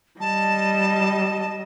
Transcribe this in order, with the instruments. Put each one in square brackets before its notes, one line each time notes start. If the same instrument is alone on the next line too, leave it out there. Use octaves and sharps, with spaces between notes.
[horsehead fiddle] G3 D#5 [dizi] A5